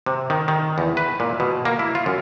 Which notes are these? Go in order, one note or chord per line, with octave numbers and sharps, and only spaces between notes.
C3
D#3
D#3
E2
B4
A#2
B2
A#3
E4
F4
F#2